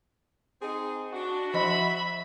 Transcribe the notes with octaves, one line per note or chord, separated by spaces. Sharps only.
C4 D#4 G#4
D4 F#4
F3 D#5 E5 B5